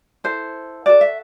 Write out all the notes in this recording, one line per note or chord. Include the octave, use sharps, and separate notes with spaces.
E4 A4 C5
F#4 A4 D5
E5